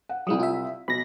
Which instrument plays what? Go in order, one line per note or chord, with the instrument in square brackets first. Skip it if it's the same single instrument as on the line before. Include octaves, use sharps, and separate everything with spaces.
[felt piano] F#5
[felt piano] C2 D#6 [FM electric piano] F#3 G#3 E4
[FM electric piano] F4 E5
[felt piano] B1 [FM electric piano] B5 A#6